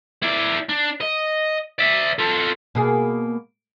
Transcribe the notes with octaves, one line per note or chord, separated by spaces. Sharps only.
E4 D5
D4
D#5
D5 E5
F4 A4
B2 A#3 G#4